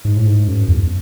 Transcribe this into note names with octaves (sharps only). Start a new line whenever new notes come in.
G#2
A2
G#2
F#2
E2